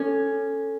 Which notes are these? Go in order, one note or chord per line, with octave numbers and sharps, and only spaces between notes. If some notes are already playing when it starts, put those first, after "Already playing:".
Already playing: C#4 A4